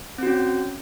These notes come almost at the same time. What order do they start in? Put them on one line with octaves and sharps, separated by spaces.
C4 F#4 C#4